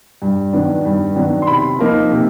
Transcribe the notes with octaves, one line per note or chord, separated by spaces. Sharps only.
G2
D#3 F#3 B3 D4
G2
D#3 F#3 B3 D4
C6
C3 B5
F3 A#3 D#4
C3